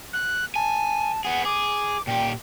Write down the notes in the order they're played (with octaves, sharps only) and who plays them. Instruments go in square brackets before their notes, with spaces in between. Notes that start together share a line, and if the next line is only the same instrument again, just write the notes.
[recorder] F#6
[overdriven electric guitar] G#5 [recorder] A5
[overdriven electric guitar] B3 G#4 [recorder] F#5
[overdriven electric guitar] G#4 [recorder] D6
[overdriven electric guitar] A#2 G4 [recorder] G5